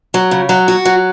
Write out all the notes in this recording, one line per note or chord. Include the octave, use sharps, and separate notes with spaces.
F#3
C#3
F#3
F#4
F#3